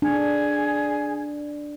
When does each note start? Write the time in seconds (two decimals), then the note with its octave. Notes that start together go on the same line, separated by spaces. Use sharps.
0.02 D4 G#4